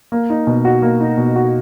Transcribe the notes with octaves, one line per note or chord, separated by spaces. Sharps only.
A#3
D#4
B2
F#4
A#3
D#4
B2
F#4